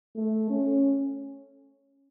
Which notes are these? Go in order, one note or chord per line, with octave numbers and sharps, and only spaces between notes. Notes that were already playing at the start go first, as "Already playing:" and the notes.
A3
C#4